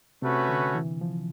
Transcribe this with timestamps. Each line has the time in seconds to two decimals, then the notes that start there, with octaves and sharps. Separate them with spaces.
0.22 C3 A3 C#4 F#4 B4
0.49 D3
0.75 E3
1.01 F3